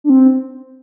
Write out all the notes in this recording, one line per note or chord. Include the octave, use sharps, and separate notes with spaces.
D4
C4